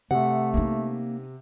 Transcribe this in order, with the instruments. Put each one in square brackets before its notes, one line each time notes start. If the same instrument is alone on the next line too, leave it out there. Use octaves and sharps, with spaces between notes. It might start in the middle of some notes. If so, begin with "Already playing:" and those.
[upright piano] C3 [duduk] A3 [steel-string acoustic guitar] F#5
[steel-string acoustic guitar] A#3 [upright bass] C#4 D#4